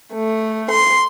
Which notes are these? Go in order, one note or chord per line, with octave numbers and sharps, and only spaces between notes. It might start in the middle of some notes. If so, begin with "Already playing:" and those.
A3
C6